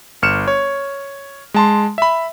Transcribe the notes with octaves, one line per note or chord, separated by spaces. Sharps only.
G1 F6 C#7 E7
C#5
G#3 A5 C6
E5 B5